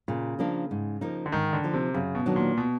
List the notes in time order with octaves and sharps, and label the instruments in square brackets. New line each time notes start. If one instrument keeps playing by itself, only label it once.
[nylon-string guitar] A#2 [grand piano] C#3
[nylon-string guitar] F3 A#3 D4
G#2
F3 A#3 D#4
[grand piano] D3
[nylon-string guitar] G#2 [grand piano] D#3
[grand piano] D3
[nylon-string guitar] F3 A#3 D#4
[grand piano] C3
[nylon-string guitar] F#2 [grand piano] C#3
[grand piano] B2
[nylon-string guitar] D#3 F#3 B3 D4
[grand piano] A#2
B2